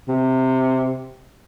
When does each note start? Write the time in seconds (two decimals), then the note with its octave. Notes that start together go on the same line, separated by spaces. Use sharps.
0.08 C3